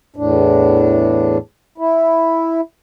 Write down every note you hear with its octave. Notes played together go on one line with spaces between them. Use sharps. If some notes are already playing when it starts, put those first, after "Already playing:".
E2 A2 D4
E4